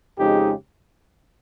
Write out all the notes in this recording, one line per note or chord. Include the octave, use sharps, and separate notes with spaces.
F2 C#3 G#3 D#4 G4